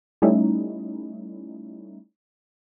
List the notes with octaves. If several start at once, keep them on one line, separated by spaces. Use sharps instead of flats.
G3 A3 C#4 D#4 E4